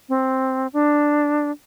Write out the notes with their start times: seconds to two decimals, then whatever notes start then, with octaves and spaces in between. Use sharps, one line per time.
0.09 C4
0.73 D4